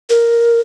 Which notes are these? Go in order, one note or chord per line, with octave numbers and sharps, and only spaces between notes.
A#4